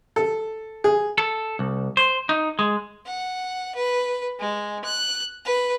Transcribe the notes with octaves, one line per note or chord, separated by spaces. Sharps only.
A4
G#4
A4
C2
C5
D#4
G#3
F#5
B4
G#3
F#6
B4